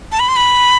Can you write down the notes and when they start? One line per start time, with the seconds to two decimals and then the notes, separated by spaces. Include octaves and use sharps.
0.12 A5
0.20 B5
0.28 C6
0.36 B5